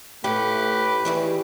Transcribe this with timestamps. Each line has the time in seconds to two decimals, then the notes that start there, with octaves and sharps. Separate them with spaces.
0.24 A2 A3 G4 B4
1.05 D#2 C#3 E3 G3